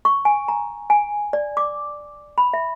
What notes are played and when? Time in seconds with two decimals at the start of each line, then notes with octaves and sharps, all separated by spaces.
0.05 C#6
0.25 G#5
0.48 A#5
0.90 G#5
1.33 D5
1.57 D6
2.38 B5
2.54 E5